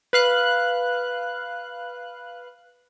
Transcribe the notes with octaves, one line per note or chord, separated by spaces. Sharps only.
B4 F5 F#6